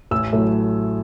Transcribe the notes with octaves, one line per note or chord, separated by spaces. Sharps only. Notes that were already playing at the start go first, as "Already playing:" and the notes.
A1 E6
A2 F#3 A3